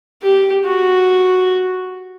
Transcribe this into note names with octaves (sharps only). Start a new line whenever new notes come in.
G4
F#4